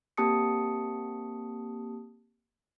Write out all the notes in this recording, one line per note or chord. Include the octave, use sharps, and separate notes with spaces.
A#3 C4 G4 A5 D#6 C#7